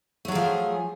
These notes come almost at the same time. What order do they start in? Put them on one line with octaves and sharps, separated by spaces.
A3 F#3 G#4 F3